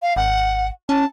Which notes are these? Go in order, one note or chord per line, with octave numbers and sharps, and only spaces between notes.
F5
G#1 F#5
C#4 A5